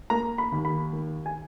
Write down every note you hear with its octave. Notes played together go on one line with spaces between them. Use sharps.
A#3 A#5
B5
D#2
B5
D#3
G#5